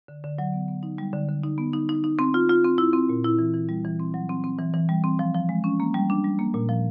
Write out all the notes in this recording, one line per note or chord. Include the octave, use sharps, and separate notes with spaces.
D3
D3
F#3
B3
B3
D#4
G3
D3
D3
D#4
B3
D#4
D#4
D#4
C4
F4
F4
C4
E4
C4
A#2
E4
E3
E3
G3
E3
C4
F#3
C4
C4
E3
E3
G3
C4
F3
F3
G#3
C#4
A#3
G3
D4
G3
A#3
A#2
F3